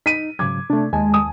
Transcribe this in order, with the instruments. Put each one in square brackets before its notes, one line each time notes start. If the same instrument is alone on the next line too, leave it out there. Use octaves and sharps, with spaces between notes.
[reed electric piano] D#4 [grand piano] B6 D#7
[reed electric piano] G#2 C#3 F#3 [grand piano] D6 G#6
[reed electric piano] C3 A3 [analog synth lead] D4
[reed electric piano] D#2 G#5 A5 [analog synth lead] G#3
[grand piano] D#6